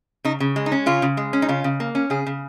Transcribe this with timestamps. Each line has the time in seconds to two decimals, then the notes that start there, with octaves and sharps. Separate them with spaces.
0.25 C#3 D#4
0.40 C#3
0.56 G#3
0.66 D#4
0.72 C#4
0.86 C#3 F4
1.02 C#3
1.17 G#3
1.33 C#4
1.42 D#4
1.49 C#3 F4
1.64 C#3
1.80 A#3
1.95 C#4
2.10 C#3 G#4
2.27 C#3